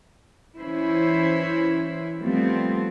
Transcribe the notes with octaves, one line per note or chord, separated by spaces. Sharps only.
E3 C#4 E4 C5
F3 G3 A3 B3 C4